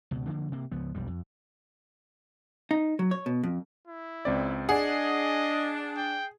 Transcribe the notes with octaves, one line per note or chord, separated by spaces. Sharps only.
C#2 B2
D3 F3 A#3
C3 A#3
C#2 F3 B3
E1 B1 G3
F2
D#4
F#3
C#5
B2
F2
E4
C#2 C4 D5
D4 G#4 D5 D#5 F#5
G5